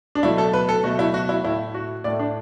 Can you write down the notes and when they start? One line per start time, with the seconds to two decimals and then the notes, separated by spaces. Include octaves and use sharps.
0.15 D4
0.23 B2 F#3 A3 E4
0.38 A4
0.54 B4
0.69 A4
0.84 B2 F#3 A3 F#4
0.99 E4
1.14 F#4
1.29 E4
1.44 A2 A3 E4
1.74 F#4
2.04 A2 A3 D5
2.19 D4